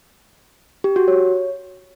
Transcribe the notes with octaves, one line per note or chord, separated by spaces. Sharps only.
G4
F#4
C#5